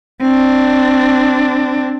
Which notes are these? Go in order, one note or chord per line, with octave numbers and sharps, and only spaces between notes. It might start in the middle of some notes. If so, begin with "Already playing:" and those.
C4 D4